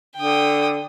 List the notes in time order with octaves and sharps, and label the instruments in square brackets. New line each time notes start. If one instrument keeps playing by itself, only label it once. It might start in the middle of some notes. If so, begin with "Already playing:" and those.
[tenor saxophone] D3 [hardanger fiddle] G5 D#6